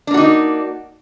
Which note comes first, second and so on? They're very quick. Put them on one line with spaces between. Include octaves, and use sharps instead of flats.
D4 A#3 F#4 D#4